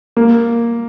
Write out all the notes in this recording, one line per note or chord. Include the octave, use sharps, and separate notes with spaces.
A#3